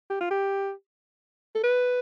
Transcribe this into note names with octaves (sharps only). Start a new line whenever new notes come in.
G4
F4
G4
A4
B4